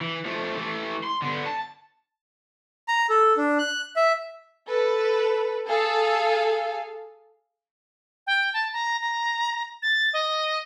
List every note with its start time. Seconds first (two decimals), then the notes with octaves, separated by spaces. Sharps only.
0.01 E3
0.25 F3 A3
0.56 E3 A3
1.03 C6
1.22 D3 B3
1.47 A5
2.88 A#5
3.10 A4
3.37 D4
3.59 F#6
3.96 E5
4.68 A4 B4
5.67 G#4 A4 F5
8.27 G5
8.53 A5
8.73 A#5
9.01 A#5
9.82 A6
10.13 D#5